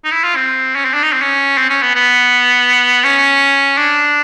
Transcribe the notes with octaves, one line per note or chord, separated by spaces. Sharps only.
D#4
E4
F4
C4
C#4
C4
D4
D#4
C4
C#4
C4
C#4
B3
B3
C#4
D4